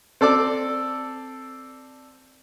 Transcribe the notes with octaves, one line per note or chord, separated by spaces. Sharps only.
C4 A4 D5 D6